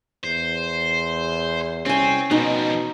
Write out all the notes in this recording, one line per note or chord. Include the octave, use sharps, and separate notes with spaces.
E2 C5
C2 C4 C#4 G#5
B2 F3 G3 D#4